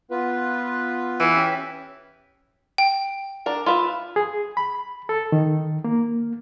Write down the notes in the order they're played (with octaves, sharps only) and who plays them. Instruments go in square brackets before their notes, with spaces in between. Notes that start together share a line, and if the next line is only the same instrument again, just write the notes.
[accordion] B3 F4 B4
[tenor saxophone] E3
[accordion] C#4 G4 E5
[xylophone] G5
[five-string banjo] D4 A#4
F4 B4 E5
[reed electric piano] G#4
B5
A4
D#3
A#3